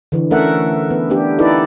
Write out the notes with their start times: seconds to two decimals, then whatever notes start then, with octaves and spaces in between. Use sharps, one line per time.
0.12 D3 E3
0.31 A3 C#4 A4 A#4 E5 F#5
0.91 B3
1.10 B3 D4 G4
1.39 D#4 E4 A4 B4 D5